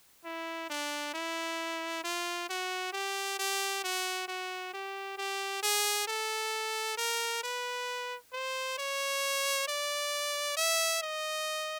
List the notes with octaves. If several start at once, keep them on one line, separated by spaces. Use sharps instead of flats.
E4
D4
E4
F4
F#4
G4
G4
F#4
F#4
G4
G4
G#4
A4
A#4
B4
C5
C#5
D5
E5
D#5